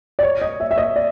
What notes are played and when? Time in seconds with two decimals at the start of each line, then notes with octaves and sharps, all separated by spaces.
0.19 D5
0.23 C#5
0.42 D#5
0.60 E5
0.71 E5
0.78 D#5
0.96 D5